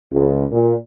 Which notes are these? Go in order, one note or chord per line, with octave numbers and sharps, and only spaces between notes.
C#2
A#2